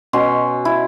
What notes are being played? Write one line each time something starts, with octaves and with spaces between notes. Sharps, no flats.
B2 C#4 C6
E4